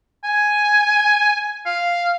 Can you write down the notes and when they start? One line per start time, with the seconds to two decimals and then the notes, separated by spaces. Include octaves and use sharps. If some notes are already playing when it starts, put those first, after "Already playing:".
0.24 G#5
1.66 F5